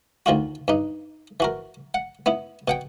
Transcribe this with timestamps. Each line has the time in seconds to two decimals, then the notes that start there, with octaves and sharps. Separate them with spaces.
0.26 D2 D#3 F4 F#4
0.68 G2 D#4
1.40 E3 F#4 A#4
1.94 F#5
2.26 B3 E4
2.68 B2 F#5 G5